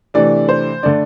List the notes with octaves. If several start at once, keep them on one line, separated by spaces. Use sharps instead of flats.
C3 E3 A3 D4 D5
C5
D3 A3 D4 D5